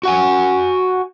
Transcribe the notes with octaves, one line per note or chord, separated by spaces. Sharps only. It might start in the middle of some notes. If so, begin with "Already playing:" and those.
F#4 F#5 G#5